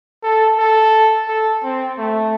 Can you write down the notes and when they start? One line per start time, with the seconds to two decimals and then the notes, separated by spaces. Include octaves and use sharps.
0.23 A4
0.58 A4
1.28 A4
1.63 C4
1.98 A3